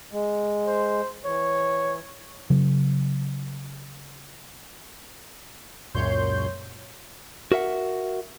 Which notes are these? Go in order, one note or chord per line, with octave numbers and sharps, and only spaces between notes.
G#3
C5
E3 C#5
C#3 F#3
C#2 F#2 A#2 C#5 C6 G6
F#4 A#4 E5 F#5